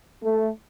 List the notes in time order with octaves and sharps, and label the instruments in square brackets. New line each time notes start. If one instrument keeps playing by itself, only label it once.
[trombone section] A3